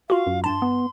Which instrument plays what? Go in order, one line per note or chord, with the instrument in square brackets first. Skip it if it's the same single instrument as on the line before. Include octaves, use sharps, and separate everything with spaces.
[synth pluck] F4 F#4 [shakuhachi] F5
[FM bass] F#2
[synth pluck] G2 A5 [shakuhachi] C6
[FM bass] B3